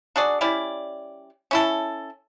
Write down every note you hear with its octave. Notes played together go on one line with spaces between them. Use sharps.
D4 F#4 G#4 D5
G3 C#4 E4 D5
C#4 E4 A4